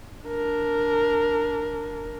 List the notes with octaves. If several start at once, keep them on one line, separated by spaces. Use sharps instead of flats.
D4 A#4